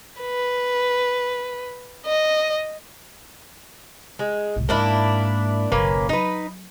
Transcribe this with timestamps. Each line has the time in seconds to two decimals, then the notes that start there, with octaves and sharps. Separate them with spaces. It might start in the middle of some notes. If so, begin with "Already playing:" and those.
0.21 B4
2.06 D#5
4.19 G#3
4.56 C2 A2
4.69 G#2 A#3 D4 E4
5.72 F#1 B1 A#3 C#4 B4
6.09 F#3 D#4 B4